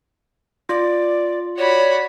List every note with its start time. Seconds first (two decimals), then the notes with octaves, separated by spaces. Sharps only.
0.69 F4 D5
1.58 F#4 C#5 D5 B5